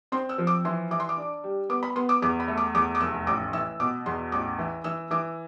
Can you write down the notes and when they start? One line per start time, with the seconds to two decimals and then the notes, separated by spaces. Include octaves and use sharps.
0.12 C4 C6
0.29 E6
0.38 F3
0.47 D6
0.65 E3 C6
0.91 E3 D6
1.00 C6
1.09 D6
1.17 D4
1.44 G3
1.70 B3 D6
1.83 B5
1.96 B3 C6
2.09 D6
2.22 E2 D6
2.40 B5
2.48 A3
2.57 D6
2.75 E2 D6
2.95 D6
3.00 F1 E6
3.27 A1 D6
3.53 E3 E6
3.80 B2 D6
4.06 E2 C6
4.32 A1 D6
4.59 E3
4.84 E3 E6
5.11 E3 D6